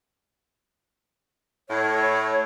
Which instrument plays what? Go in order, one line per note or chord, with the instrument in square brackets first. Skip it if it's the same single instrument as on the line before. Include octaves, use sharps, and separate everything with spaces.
[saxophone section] A2 [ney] C#5